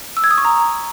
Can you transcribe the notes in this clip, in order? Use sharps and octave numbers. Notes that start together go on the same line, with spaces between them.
E6
G#6
D#6
C#6
A#5